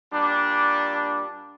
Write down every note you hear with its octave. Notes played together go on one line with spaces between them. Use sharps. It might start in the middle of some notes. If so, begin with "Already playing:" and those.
A#2 G3 D4